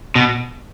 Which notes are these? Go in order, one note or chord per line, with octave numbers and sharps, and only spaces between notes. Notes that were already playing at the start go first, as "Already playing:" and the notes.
B2